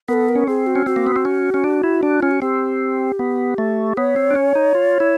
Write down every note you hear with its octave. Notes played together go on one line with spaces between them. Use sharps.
B3 A4 A#4
A#4
C#4
C4 G#4
F#4
C#4
C4 F#4
A#3
B3
C4
C#4
C#4
D4
E4
D4
C#4 F4
F#4
C4 G4
B3
A3
B3 C#5
C4
D4
C#4
D#4
F4
E4